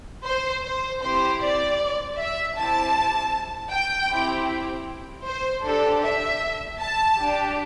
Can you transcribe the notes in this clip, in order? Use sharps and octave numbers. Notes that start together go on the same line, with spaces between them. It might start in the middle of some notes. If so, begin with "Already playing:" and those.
C5
C5
C4 E4 G4 C5
D5
E5
C4 E4 G4 A5
G5
C4 E4 G4
C5
D4 G4 A4
E5
A5
D4 G4